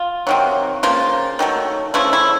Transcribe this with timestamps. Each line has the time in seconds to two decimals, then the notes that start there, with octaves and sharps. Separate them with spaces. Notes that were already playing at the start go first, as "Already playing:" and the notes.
Already playing: F4
0.27 C3 D#3 F#3
0.83 C#3 F3 A#3 F4
1.39 D#3 F#3 A3
1.94 C#3 F3 A3 E4
2.13 E4